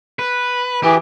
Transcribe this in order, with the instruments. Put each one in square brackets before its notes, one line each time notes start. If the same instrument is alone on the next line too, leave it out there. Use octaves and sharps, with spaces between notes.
[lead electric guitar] B4
[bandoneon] E3 [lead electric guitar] G4 G#4